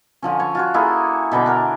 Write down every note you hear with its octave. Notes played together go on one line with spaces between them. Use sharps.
D3 F3 C#4
C#5
F4 F#4 C#5
A#3 E4 G#4 A4
B2 D3 B5 D6
D4 A#4